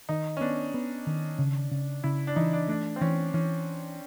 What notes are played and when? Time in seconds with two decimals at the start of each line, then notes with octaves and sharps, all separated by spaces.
0.09 D#3 D#4
0.37 C#4
0.41 B3 D4
0.74 B3
1.07 D#3
1.39 C#3
1.71 C#3
2.04 C#3 E4
2.27 D4
2.36 E3 D#4
2.53 D4
2.68 A3 D4
2.96 C4
3.01 E3 C#4
3.34 E3 C#4